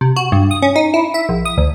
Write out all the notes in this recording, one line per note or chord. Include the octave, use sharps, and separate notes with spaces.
C3
F#4
G2
D#6
C#4
D#4
E4
E5
A#1
D#6
D2